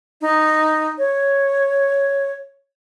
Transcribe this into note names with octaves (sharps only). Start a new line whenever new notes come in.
D#4
C#5